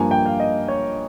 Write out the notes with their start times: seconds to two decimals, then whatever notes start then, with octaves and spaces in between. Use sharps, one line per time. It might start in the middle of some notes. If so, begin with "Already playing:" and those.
Already playing: G2 F3 A#3 G#5
0.11 G5
0.26 F5
0.40 D#5
0.68 C#5